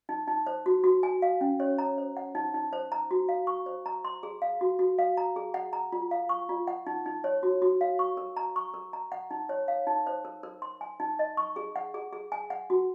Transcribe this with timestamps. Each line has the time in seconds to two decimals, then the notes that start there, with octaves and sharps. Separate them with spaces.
0.09 D#4
0.27 D#4
0.47 C5
0.66 F#4
0.84 F#4
1.03 G#5
1.22 F5
1.41 C#4
1.60 C#5
1.78 A#5
1.98 C5
2.17 F#5
2.35 D#4
2.54 D#4
2.73 C5
2.92 A#5
3.11 F#4
3.29 F5
3.47 C#6
3.66 C5
3.86 A#5
4.05 C6
4.23 G#4
4.42 F5
4.61 F#4
4.79 F#4
4.98 F5
5.17 A#5
5.36 G#4
5.54 F#5
5.73 A#5
5.92 F4
6.11 F5
6.29 C#6
6.49 F4
6.67 F#5
6.87 D#4
7.06 D#4
7.24 C#5
7.43 F#4
7.62 F#4
7.81 F5
7.99 C#6
8.17 A#4
8.37 A#5
8.56 C#6
8.74 A#4
8.93 A#5
9.12 F#5
9.31 D#4
9.49 C#5
9.68 F5
9.87 D#4
10.07 C5
10.25 A#4
10.43 A#4
10.62 C6
10.81 G#5
11.00 D#4
11.19 D#5
11.37 C#6
11.56 G#4
11.76 F#5
11.94 G#4
12.13 G#4
12.32 G#5
12.50 F#5
12.70 F#4